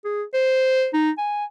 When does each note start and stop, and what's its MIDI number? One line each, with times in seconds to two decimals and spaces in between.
0.05 0.23 68
0.34 0.88 72
0.94 1.11 63
1.18 1.45 80